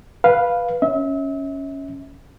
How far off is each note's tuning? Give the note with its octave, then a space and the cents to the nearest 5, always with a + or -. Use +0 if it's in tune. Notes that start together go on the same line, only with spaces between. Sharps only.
B4 -5 F5 +0
C#4 +0 E5 -35